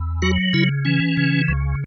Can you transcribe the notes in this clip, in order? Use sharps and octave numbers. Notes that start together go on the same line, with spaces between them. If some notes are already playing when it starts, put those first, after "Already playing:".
Already playing: E2
F#3 F#4
C#3 E4
E3 C#4
C#3
C#2